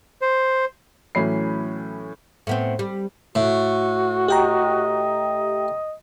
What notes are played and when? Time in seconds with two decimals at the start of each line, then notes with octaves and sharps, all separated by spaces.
0.21 C5
1.15 A2 E3 F#3 C#4 B5 C7
2.47 A2 B3 C4
2.79 G3
3.35 A2 F#4
4.28 G4 D#5 G5 A#5